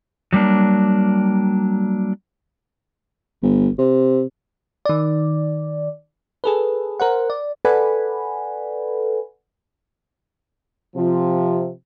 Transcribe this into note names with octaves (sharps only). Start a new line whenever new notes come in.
F#3 G3 A#3 D4
G1
C3
D#3 D5
G#4 A4 B4
A#4 C5 F#5
D5
A4 B4 D5 F#5 G#5 B5
C3 F3